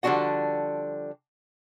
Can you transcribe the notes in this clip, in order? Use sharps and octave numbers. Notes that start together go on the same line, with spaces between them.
D3 F3 G3 D4 F#4 F#5